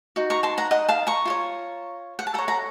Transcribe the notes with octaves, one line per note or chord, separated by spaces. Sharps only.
D#4 F#4
A#5 C#6
A5 C6
F#5 A#5
D#5 F#5
F5 A5
A#5 C#6
F4 A#4 C#5
F#5
A5
A4 C#5 F#5 A#5
F#5 A#5